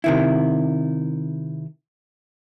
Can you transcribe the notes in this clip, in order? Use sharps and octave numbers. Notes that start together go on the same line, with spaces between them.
C3 D#3 E4